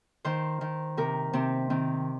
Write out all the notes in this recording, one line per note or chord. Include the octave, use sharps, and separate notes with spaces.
D#3 C5
D#3
C3 A#4
C3 C4
D#3 C4